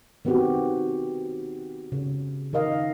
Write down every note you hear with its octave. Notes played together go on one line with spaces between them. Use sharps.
D#3 B3 C4 F#4 G4
C#3
D#3 A#4 D#5 F5